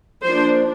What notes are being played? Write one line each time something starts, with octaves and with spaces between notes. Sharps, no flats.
F3 A#3 D4 C5